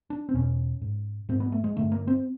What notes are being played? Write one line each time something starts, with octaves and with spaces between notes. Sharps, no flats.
D4
C4
E2 B2 C#4
G#2
G#2 C4
B3
A3
G#3
G2 D3 A3
A#3
C4